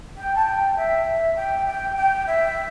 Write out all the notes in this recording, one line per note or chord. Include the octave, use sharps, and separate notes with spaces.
G5
A5
G5
E5
G5
G5
G5
E5